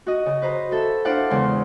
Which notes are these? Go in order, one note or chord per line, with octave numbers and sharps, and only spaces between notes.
F#4 D#5
C#3
B4 C5 A#5
F#4 A4 E5
D4 E4 C5 D5 F5 F#5
E2 C#3 G#3 C6